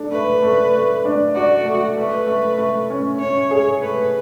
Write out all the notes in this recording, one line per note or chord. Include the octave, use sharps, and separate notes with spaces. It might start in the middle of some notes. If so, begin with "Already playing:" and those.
Already playing: D4 A4
A3 B4
A3
A3
D4
F#4 D5
A3
A3 B4
A3
A3
C#4
C#4 C#5
G#4
A3 B4